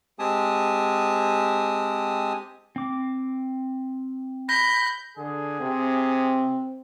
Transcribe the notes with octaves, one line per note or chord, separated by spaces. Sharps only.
G#3 C4 G4 G#5 A5 D#6
C4 D6
B5 G6 A#6
D3 G#4
C3 C4